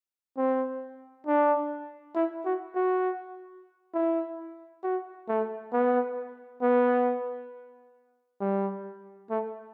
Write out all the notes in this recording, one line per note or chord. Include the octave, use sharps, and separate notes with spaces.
C4
D4
E4
F#4
F#4
E4
F#4
A3
B3
B3
G3
A3